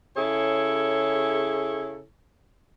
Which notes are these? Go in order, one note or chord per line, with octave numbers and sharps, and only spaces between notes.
C#3 E4 G#4 A4 C#5